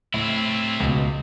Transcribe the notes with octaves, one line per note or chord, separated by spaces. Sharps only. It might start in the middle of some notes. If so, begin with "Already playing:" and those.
A2 C4 E4
C#2 B2